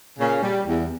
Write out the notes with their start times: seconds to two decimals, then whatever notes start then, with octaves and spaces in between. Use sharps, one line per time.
0.18 A#2 C#3 C#4
0.42 G3
0.66 E2